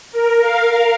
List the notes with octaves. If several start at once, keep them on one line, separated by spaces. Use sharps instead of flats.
A#4
F5